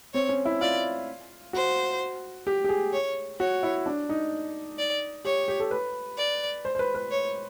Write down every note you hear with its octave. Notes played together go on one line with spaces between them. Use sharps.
C4 C#5
C#4
E4
F4 D5
F#4 C5
G4
G4
G#4
C#5
F#4 C#5
E4
D4
D#4
D5
G4 C#5
G4
A4
B4
D5
C5
C5
B4
B4
C#5